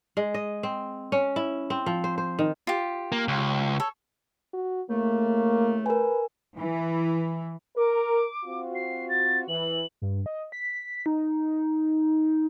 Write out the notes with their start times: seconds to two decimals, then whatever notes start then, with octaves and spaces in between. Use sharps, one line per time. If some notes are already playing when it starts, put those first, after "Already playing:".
0.17 G#3
0.34 D#5
0.63 C4
1.12 C#4
1.36 E4
1.70 C4
1.86 F3
2.04 C5
2.18 C5
2.39 D#3
2.67 F4 G4
3.12 A#3
3.28 C#2
3.80 A4 C#5
4.54 F#4
4.90 A2 C#3 A3 A#3
5.86 A#4 B4 G#5
6.57 E3
7.77 A#4 D6
8.45 C4 F4 F#4
8.75 C7
9.09 A6
9.48 E3 F#7
10.02 G2
10.26 D#5
10.52 B6
11.06 D#4